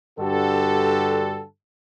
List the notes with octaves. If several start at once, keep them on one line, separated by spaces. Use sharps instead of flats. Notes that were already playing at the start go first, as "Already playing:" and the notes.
G2 D3 F#4 G4 A4